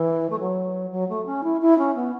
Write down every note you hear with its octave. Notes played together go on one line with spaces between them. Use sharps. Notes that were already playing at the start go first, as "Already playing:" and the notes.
Already playing: E3
A3
F#3
F#3
A3
C#4
E4
E4
C#4
B3